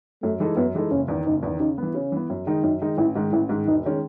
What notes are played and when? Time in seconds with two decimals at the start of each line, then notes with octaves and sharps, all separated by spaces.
0.23 F#2 A3
0.40 E3 G#3 D#4 A4
0.56 F#2 B3
0.75 E3 G#3 D#4 A4
0.91 F#1 C#4
1.08 E2 D#3
1.25 F#1 D#4
1.42 E2 D#3
1.60 C#3 D#4
1.78 E3 B3
1.94 C#3 C#4
2.12 E3 B3
2.30 F#2
2.46 D#3 G#3 D#4
2.63 F#2 D#4
2.81 D#3 G#3 D#4
2.98 A1 E4
3.15 G#2 D#3 G#3
3.32 A1 E4
3.49 G#2 D#3 G#3
3.66 E1 D#4
3.86 D#3 G#3 C#4